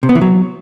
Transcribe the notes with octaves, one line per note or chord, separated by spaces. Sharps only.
C3
B3
E3
F#3